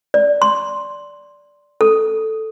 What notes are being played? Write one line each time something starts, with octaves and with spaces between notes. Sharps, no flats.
D5
C6
A4